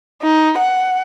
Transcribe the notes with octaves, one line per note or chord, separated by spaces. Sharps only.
D#4
F#5